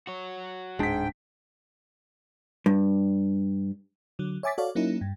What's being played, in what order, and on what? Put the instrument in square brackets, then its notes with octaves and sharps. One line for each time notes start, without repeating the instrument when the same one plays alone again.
[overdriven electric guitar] F#4 C#5
[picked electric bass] D1 D4 [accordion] G#2 G5 [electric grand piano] G#3 B6
[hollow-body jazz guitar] G2
[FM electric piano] D3 F#3
C#5 E5 G#5 D6 A6 B6
F#4 A4 C#5 D5 F5
F#3 A#3 C#4 D#4 E4
G2